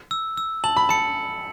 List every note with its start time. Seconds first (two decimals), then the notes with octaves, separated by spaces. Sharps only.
0.11 E6
0.37 E6
0.64 A5 F#7
0.77 B5
0.89 A5 C#7